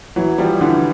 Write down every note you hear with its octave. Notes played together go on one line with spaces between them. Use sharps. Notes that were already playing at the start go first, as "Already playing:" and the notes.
E3 F#3
F3 G3
D3 E3